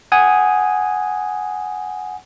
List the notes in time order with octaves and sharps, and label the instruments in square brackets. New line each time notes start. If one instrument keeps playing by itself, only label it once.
[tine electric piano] F#5 G#5 D#6